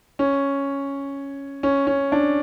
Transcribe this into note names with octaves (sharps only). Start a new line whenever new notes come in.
C#4
C#4
C#4
D4